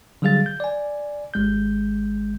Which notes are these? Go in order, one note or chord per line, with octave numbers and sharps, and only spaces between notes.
D3 F#3 G3 G#4 F5 A6
G6
D5 G#5
G#1 G#3 G6